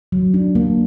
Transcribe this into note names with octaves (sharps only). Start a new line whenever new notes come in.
F#3
D4
A#3